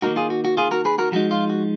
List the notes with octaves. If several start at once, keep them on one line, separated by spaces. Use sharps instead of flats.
D#3 A#3 D#4 F#4 A#4
F4 G#4
F#4
F#4
F4 G#4
F#4 A#4
G#4 B4
F#4 A#4
F3 G#3 D#4 F#4
F4
F#4